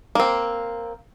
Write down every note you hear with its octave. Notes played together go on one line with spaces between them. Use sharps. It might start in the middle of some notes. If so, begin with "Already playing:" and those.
A#3 C4